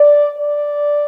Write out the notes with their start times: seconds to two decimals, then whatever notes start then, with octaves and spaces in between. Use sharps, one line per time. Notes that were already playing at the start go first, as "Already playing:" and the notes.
Already playing: D5
0.37 D5